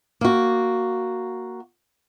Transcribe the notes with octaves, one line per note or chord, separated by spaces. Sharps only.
A#3 F#4